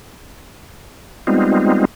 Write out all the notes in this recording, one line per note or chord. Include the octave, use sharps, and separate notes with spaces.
G3 G#3 B3 C4 D#4 F4